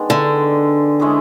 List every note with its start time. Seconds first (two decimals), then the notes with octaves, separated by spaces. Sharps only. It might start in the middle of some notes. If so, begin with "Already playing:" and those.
Already playing: D#3 G#3 B3 D4
0.10 D3
1.00 G#3 C#4 E4 G#4